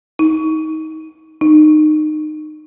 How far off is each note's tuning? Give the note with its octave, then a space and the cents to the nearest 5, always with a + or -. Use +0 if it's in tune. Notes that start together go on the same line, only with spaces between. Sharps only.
D#4 +25
D#4 -25